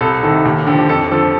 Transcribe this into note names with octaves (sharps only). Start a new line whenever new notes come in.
C2 A4
C3 D#3 A4
D#2 G4
D3 F3 G4
G4
F2 A4
D3 F3 A4